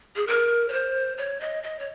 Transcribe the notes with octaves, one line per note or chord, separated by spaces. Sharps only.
G#4
A#4
C#5
C5
C#5
D#5
D#5
C#5